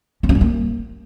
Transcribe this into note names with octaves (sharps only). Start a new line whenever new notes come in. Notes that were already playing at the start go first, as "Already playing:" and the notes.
C#4
F#3
G3
A#3